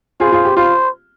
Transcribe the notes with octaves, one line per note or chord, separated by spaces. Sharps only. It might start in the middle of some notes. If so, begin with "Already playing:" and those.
F4 G#4 C5
F4 G#4
G4
F4 C5